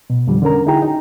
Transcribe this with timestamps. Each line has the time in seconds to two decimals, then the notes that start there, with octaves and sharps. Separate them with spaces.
0.10 B2
0.27 F2 D3 F3 G3
0.42 D3 C#4 A#4 A#5
0.66 D#4 E4 F#4 G#4 G5 A#5
0.82 D#4